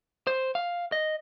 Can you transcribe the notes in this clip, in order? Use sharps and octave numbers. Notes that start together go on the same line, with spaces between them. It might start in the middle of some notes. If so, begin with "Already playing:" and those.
C5
F5
D#5